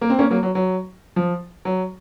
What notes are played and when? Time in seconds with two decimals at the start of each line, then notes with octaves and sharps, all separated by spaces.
0.01 A#3
0.10 C4
0.19 A#3 C#4
0.30 F#3 A#3
0.43 F#3
0.55 F#3
1.16 F3
1.65 F#3